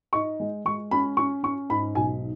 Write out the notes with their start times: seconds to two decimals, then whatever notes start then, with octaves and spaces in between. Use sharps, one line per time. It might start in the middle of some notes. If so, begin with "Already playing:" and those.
0.13 D#4 C#6
0.40 G#3
0.65 G#3 C#6
0.91 C#4 B5
1.17 C#4 C#6
1.43 C#4 C#6
1.69 G#2 B5
1.95 B1 G#5